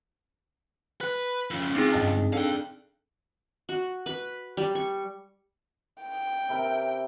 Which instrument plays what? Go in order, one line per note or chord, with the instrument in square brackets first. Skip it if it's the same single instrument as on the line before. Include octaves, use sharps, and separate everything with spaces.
[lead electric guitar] B4 [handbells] F#6
[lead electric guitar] F2 C#3
[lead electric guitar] C#2 [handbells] C4 D#4 G#4
[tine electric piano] G2 D#5 A5
[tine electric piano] D4 A4 [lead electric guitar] F5 G5
[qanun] F#4
B4
G3
C#6
[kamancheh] G5
[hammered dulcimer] C3 E4 A#4